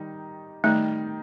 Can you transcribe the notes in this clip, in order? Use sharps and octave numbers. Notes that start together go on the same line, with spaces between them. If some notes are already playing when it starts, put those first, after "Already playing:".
Already playing: D#3 G3 D#4
D#3 G3 A3 D#4